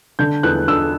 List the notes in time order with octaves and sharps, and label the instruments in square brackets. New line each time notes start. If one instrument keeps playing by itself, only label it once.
[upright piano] D3 G6
E2 F#6
D4 E6